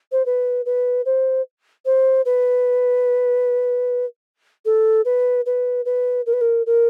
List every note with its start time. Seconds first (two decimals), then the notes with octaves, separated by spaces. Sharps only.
0.12 C5
0.26 B4
0.66 B4
1.06 C5
1.86 C5
2.25 B4
4.65 A4
5.05 B4
5.46 B4
5.85 B4
6.26 A#4
6.33 B4
6.41 A#4
6.66 A#4